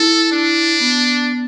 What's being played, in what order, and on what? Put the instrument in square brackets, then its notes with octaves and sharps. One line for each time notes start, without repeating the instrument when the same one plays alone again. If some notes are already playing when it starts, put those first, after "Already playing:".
Already playing: [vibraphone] E4 [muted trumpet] A4
[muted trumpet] D4
[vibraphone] B3